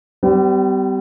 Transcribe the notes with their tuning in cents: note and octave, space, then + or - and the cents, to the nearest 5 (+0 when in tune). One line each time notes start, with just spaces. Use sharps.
G3 -20 B3 +45